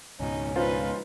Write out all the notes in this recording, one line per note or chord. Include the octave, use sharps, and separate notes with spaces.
C#2 G#2 B2 C#4 D#4
D#4 F4 B4 C5